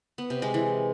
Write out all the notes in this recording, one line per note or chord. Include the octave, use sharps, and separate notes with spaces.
B3
C3
G#3
E3